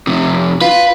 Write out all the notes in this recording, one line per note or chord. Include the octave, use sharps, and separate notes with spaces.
F2 C3
F4 B4